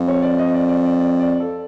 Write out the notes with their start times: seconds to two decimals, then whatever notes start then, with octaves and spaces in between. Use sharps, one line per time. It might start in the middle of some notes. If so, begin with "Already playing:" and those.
Already playing: F2
0.08 C#5
0.22 D5
0.39 D#5
0.54 D5
0.68 D5
0.85 D5
1.00 D5
1.20 D5
1.40 A4